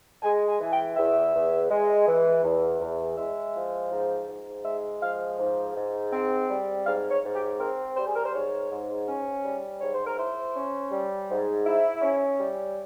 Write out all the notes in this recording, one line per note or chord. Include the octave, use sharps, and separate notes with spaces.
G#3 G#5
G#5
E3 G#5
G5
E2 E5
E2
G#3
E3
E2
E2
G#3 E5
F3
G#2
G#2
G#3 E5
F3 F5
G#2
G#2
C4
G3
G#2 F5
C#5
G#2
G4
C4 A#4
G3 C5
G#4
A#4
C5
G#2 C#5
G#2
C#4
G3
G#2 C#5
C5
A#4
E4 C5
C#4
G3
G#2
E4
C#4
G3